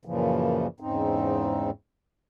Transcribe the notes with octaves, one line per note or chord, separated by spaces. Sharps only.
F#2 A#2 C#3 E3 F3
E2 G#2 C#3 C4 D#4